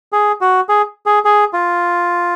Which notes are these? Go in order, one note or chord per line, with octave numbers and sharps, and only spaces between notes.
G#4
F#4
G#4
G#4
G#4
F4